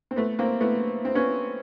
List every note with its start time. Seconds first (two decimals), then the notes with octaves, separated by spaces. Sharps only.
0.11 C4
0.16 A3 B3
0.39 A#3 C4
0.61 A3 B3
1.05 C4
1.15 B3 C#4